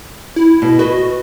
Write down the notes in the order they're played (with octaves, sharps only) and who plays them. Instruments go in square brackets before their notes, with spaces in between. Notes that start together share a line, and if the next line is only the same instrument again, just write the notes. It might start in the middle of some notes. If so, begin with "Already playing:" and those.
[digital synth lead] E4
[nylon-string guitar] B2
[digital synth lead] F#4 [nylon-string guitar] B4 D#5